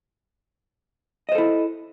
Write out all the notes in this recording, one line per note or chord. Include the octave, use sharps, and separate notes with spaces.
E4 A4 C5 D#5